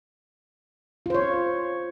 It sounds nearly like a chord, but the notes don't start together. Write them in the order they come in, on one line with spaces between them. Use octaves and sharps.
F4 C5 C#5